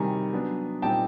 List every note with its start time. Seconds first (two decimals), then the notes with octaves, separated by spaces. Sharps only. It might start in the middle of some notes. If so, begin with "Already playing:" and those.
Already playing: C3 D#3 G3 G#5 A#5
0.33 F#3 B3 D4
0.82 A#2 G3 C4 D#4 G4 G5 A5